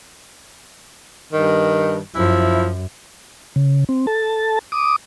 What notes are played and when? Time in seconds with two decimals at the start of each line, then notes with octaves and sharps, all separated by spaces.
1.33 G2 D#3
2.14 F#2 F3 E4
3.56 C#3
3.89 C4
4.07 A4 A5
4.72 D6 D#6